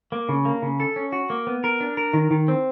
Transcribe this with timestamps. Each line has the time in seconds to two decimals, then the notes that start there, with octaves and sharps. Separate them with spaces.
0.12 A#3
0.29 C#3
0.45 A#3
0.62 C#3
0.80 A4
0.96 C#4
1.12 F#4
1.30 A#3
1.47 B3
1.64 A#4
1.80 D4
1.97 A#4
2.13 D#3
2.31 D#3
2.48 C4